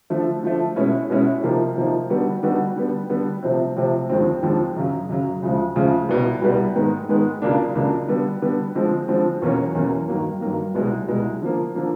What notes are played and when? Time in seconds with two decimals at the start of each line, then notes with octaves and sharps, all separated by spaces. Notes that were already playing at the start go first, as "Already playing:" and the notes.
0.10 D3 F3 A3
0.43 D3 F3 A3
0.76 B2 G#3 C#4 E4
1.10 B2 G#3 C#4 E4
1.43 C3 F3 A#3 D#4
1.76 C3 F3 A#3 D#4
2.10 D3 G3 B3 D#4 F#4
2.43 D3 G3 B3 D#4 F#4
2.76 D3 G3 B3
3.10 D3 G3 B3
3.43 C3 F3 A3 C4
3.76 C3 F3 A3 C4
4.09 D#2 D3 F3 G#3 C4
4.43 D#2 D3 F3 G#3 C4
4.76 F#2 C#3 F#3
5.09 F#2 C#3 F#3
5.42 D2 C#3 F3 G#3
5.76 D2 C#3 F3 G#3
6.09 C2 B2 G3 B3
6.42 C2 B2 G3 B3
6.76 G#2 D#3 G#3 B3
7.09 G#2 D#3 G#3 B3
7.42 C#2 C#3 F#3 A#3 D4
7.75 C#2 C#3 F#3 A#3 D4
8.08 D3 G3 B3
8.42 D3 G3 B3
8.75 D3 F3 G#3 C4
9.08 D3 F3 G#3 C4
9.42 E2 B2 F#3 A#3 C#4
9.75 E2 B2 F#3 A#3 C#4
10.08 G2 D#3 F#3 A#3
10.41 G2 D#3 F#3 A#3
10.75 C2 B2 G#3
11.08 C2 B2 G#3
11.41 D3 F3 A#3
11.75 D3 F3 A#3